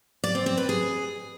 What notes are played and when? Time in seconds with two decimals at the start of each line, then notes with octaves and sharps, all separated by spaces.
0.24 D5
0.35 C4
0.46 C4
0.58 B4
0.69 G#4